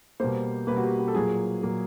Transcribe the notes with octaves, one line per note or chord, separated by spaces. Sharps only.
B2 G3 A#3 C5
B2 G3 A#3 B4
F#4
G4
G4
A4
A#2 F#3 A#3 G#4
A#2 F#3 A#3